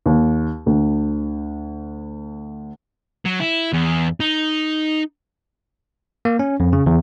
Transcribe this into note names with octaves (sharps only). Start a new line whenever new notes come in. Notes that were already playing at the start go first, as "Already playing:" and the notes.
D#2
D2
F#3
E4
E2
D#4
A#3
C#4
F2
C#3
E2